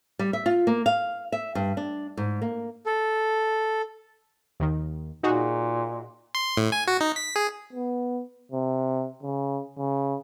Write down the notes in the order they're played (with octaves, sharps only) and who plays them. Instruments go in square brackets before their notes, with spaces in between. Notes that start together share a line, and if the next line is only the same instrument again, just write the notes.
[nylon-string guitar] G3
E5
F4
A#3
F5
E5
G2
D4
G#2
A#3
[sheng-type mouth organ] A4
[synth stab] D#2 D#3
[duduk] A#2 [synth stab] D#4 F#4 G#4
[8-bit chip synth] C6
A2
G#5
F#4
D#4
B6
G#4
[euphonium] B3
C3
C#3
C#3